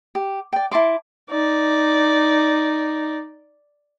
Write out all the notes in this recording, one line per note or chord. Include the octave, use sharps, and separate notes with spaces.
G4
D5 G5
E4 A5 C6 D6
D#4 D5